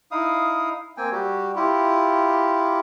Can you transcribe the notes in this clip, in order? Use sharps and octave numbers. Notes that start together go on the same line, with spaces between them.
D#4 E4 F5 D#6
A#3 C4 G5 G#5
G3 F#4 G4
E4 F4 G4